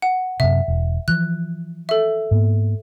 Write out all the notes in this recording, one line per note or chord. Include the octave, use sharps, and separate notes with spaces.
F#5
F#2 C3 E5
E1
E3 F3 F#6
A4 E5
G#2 A#3 B3